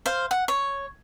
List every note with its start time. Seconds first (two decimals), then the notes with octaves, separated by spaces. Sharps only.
0.06 C5 F5
0.31 F#5
0.48 C#5